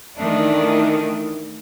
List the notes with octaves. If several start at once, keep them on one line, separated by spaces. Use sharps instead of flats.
D#3 E3 A3 D4 E4